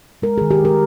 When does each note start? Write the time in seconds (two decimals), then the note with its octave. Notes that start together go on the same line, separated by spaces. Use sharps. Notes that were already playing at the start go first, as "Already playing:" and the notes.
0.22 G#3 A#4
0.38 D#3 G#4
0.51 G4
0.60 G#3 A#4